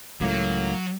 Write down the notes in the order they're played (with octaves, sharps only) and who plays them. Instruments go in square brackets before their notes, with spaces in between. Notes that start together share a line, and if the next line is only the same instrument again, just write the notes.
[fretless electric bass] C#2 A2 [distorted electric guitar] F#3 [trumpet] A#3